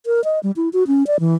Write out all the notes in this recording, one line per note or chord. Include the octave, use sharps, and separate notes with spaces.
A#4
D#5
G3
E4
F#4
C#4
D5
E3